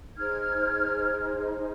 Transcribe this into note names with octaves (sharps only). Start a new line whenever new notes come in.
D#4 G#4 C5 F6 G#6